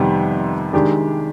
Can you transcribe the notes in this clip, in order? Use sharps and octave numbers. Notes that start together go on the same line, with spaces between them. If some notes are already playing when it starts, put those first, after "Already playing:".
Already playing: F2 C3 D#3 G3 B3
D#3 G#3 D4 G4